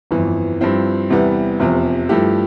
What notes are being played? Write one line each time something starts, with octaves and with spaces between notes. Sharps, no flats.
G1 F2 E3
G2 F3 C4 E4
E2 C3 E3 G3 B3
F1 E2 C3 F3
G2 F3 A3 E4 G4